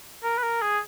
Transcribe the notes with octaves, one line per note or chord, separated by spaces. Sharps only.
A#4
B4
A#4
G#4